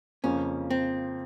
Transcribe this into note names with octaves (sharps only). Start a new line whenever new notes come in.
F2 C#3 F3 A#3 C#4
C4